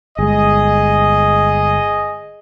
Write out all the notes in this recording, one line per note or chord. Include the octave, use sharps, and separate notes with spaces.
G1 G#3 G#4 D#5